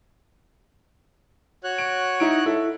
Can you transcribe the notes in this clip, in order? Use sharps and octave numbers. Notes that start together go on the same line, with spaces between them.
F#4 C#5 F#6
D7
D#4 E4 D7
E4 A4